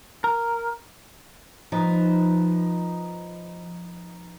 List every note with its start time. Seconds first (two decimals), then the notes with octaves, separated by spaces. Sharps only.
0.24 A#4
1.72 F3 D#4 B4